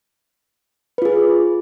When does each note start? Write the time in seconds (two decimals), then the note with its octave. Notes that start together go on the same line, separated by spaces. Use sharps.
0.98 B4
1.02 F4
1.05 G#4